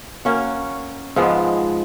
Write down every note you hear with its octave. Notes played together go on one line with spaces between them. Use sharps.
A#3 C#4 F#4
G#2 F3 G#3 B3